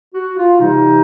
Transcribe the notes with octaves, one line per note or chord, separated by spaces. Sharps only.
F#4
F4
C3 E3 G3 D#4